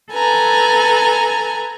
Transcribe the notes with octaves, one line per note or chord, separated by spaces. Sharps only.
A4 B4 G#5 A#5